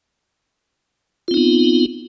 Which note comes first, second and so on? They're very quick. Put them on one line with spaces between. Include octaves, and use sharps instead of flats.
F4 C4 D#4 B3